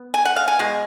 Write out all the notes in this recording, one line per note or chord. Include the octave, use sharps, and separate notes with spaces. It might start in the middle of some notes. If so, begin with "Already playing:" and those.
Already playing: B3
G#5
F#5
F5
G#5
B2 G#3